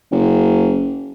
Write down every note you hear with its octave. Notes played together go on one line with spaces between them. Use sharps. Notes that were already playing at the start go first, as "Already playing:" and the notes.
F#1